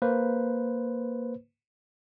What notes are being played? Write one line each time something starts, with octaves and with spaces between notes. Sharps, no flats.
A#3 B4 C5